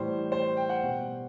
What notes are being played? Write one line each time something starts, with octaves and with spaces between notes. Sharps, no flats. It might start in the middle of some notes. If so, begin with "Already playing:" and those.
Already playing: A2 E3 G3 C5
C5
G5
F#5
B2 G3